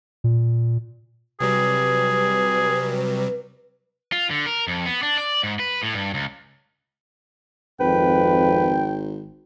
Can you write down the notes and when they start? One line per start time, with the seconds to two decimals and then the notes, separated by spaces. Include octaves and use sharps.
0.24 A#2
1.40 C3 F#3 G3 G#4 B4
4.12 F4
4.31 D3
4.46 A#4
4.68 F2
4.86 B3
5.03 D4
5.17 D5
5.43 G#2
5.59 B4
5.83 A2
5.94 G2
6.14 C#2
7.80 G#1 F2 B4 G5